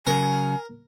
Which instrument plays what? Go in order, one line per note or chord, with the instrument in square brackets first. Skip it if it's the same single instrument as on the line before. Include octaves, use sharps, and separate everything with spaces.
[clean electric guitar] C#3 F#3 [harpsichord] A#4 [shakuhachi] G#5